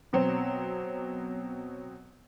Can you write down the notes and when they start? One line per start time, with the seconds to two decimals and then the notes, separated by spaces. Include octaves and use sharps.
0.13 B2 F#3 C4